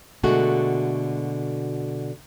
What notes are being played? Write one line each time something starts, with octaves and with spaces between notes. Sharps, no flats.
B2 D3 G#3 A3 F#4